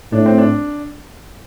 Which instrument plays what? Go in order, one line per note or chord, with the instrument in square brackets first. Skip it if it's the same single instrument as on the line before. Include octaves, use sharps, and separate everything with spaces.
[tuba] A2 [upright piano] D4
[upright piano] C4
D4